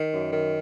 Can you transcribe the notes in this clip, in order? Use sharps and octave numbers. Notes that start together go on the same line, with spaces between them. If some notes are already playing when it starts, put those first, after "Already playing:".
Already playing: D#3
F#2
D#3